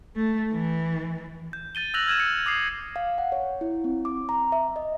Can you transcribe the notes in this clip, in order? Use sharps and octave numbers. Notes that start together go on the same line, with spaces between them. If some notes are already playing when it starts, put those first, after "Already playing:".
A3
E3
G6
G6 A6 D#7 G7
E6 F#6 G6 A#6 F7 F#7
F6 G#6 D#7 E7
C#7
D6 D#6 C7
F5
F#5
C#5
E4
C4
D6
A#5
E5
D#5